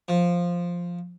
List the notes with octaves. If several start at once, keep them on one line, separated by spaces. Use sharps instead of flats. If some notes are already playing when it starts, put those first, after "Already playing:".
F3